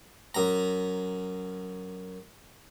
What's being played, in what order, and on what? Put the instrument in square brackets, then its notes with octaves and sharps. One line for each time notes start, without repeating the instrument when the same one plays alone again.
[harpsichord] F#2 A#5